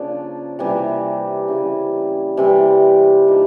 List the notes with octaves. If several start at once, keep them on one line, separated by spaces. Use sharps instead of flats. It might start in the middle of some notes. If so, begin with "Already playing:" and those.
Already playing: C#3 F3 A#3 D4
C3 E3 G3 A#3
C#3 E3 G3
C3 E3 G3 C4
F3 A#3 D#4 G4